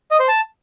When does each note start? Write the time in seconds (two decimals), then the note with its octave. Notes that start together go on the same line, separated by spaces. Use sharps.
0.11 D#5
0.20 C5
0.28 A5